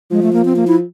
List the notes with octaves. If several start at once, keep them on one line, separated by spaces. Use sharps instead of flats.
F3 G#3
A3
A#3
C4
A#3
E4